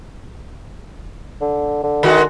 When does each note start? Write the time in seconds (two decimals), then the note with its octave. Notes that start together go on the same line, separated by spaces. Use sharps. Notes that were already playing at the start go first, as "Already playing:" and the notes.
1.41 D3
1.83 D3
2.03 D#3 G#3 F#4